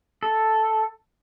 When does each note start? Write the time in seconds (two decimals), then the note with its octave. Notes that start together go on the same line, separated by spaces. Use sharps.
0.23 A4